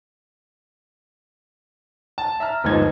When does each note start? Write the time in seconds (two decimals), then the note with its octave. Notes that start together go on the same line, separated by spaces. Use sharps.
2.18 A5
2.40 E5 A#5 F6
2.64 G1 D#2 G#2 F3 D#4 G#6